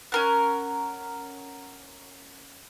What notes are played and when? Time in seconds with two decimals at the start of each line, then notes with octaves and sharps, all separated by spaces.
0.12 C#4 A#4 F#5